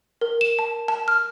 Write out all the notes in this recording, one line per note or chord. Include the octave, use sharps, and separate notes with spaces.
A#4
E7
A5
A5
F6